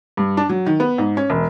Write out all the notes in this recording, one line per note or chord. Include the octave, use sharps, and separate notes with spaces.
G2
D4
F#3
D#3
B3
G#2
C#4
E1